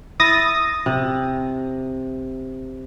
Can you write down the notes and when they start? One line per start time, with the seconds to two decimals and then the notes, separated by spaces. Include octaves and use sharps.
0.20 E4 D#6 A6 A#6
0.86 C3